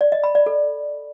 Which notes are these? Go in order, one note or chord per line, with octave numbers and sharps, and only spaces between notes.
D5
D#5
B5
D5
A4